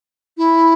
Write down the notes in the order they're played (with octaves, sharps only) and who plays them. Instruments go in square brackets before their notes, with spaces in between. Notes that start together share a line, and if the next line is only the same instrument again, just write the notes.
[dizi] E4